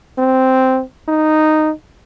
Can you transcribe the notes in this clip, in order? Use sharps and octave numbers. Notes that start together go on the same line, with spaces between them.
C4
D#4